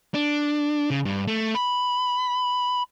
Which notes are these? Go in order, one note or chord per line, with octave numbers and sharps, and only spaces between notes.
D4
C#3
G2
A3
B5